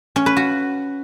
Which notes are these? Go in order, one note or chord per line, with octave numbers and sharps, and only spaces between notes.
C#4
B4
F#4